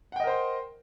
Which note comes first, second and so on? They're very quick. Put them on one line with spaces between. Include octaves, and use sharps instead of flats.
F#5 G5 D#5 A#4 C5